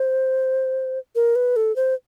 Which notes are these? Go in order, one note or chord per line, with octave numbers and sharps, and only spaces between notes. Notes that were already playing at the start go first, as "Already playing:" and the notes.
Already playing: C5
A#4
B4
A4
C5